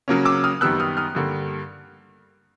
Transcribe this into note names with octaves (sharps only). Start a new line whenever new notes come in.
C#3 F#3 A#3 C#4
D6 E6
D#6 F6
F#2 D#3 G3 B3 E6 F#6
D#6 F6
D#6 F6
G2 D3 G3 A#3